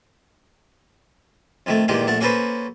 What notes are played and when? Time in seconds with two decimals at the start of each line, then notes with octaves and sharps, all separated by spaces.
1.66 F2 D#3 A3
1.88 E2 A#2 D#3 G#3 G4
2.07 A#1 A3 F#5 A5
2.20 A#3 C#4 F#4 A4 B4 C5